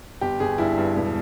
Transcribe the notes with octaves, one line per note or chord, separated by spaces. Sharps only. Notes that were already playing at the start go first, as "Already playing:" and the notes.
G1 G4
G1 G#4
G2 E4
G2
E1